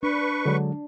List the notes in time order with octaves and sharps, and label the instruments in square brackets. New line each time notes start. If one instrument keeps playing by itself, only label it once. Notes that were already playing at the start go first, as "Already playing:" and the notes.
[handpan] D4 [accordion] B4 C#6
[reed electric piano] D3 F#3 G#3